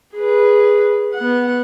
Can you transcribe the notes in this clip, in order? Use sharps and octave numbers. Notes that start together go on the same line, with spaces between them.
G#4 B4
B3 F#5